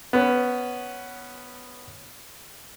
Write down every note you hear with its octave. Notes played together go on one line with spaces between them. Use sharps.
B3 C#4